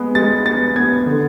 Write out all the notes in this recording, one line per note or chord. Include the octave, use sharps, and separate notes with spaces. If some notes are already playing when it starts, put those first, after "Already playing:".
Already playing: G#3 B3
G#3 A6
B3 A6
B3 G#6
D3